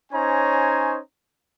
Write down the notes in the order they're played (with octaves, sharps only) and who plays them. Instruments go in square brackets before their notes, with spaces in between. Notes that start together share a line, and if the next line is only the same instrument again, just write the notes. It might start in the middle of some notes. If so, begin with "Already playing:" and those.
[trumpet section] C#4 D#4 C5 C#5 G#5 A#5